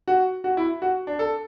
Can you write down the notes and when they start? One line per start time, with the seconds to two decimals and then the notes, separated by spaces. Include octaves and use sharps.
0.08 F#4
0.44 F#4
0.57 E4
0.82 F#4
1.07 D4
1.19 A4